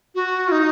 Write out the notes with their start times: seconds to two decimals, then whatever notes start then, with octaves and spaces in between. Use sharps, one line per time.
0.15 F#4
0.48 F4
0.52 D#4